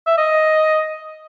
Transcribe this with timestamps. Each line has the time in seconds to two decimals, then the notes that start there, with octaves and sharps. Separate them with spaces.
0.07 E5
0.18 D#5